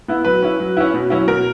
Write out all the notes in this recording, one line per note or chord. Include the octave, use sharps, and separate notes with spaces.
B3 E4
F#3 B4
C#4 E4
F#3
C#4 E4
B2
F#3 C#4 E4
B2 A#4